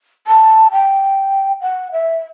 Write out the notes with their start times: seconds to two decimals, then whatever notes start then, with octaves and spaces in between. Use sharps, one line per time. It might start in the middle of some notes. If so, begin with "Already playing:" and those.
0.27 A5
0.72 G5
1.61 F#5
1.92 E5